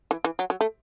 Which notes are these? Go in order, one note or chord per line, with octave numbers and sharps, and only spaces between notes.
E3
E3
F#3
F#3
A3